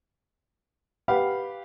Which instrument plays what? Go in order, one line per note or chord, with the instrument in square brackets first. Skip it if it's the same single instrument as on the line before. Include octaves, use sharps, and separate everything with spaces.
[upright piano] G4 B4 F5 F#5 B5